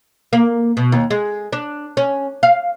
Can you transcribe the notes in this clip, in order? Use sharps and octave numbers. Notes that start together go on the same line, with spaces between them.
A#3
B2
D#2
G#3
D4
C#4
F5